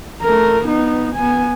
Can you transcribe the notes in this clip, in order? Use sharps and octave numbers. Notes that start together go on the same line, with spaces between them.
A3 A#4
B3 D#4
B3 G#5